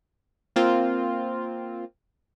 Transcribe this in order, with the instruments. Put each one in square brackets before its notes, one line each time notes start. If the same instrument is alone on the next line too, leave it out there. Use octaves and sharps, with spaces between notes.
[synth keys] A#3 C4 F4